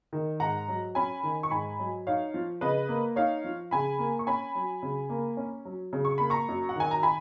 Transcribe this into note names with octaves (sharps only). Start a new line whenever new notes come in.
D#3
G#2 F#5 A#5
F#3
C#4 G#5 B5
D#3
C#6
G#2 G#5 B5
F#3
D#4 C#5 F5
F3
C#3 B4 D#5
A#3
D#4 C#5 F5
F3
C#3 G#5 B5
A#3
C#6
C#4 G#5 B5
F#3
C#3
A#3
C#4
F#3
C#3
C#6
A#3 B5
A#5 C#6
F#2
F#5
D#3 G#5
A#5
G#5 B5